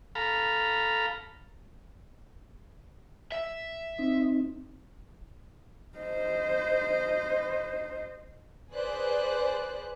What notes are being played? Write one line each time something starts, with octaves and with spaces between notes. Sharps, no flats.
A4 F5 A#5 B5
E5
C4 D#4
C5 D#5
G#4 B4 C5 D5 F#6